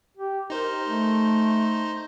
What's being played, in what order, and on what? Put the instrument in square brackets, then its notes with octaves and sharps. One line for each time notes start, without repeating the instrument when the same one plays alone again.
[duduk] G4
[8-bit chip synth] D#4 C5 [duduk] A#4
[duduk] A3